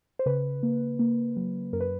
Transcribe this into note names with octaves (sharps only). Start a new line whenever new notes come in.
C5
C#3 B4
A#3
A#3
F#3
F#2 A#4
B4